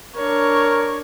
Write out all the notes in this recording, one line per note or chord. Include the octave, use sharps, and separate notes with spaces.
D4 A#4 C#5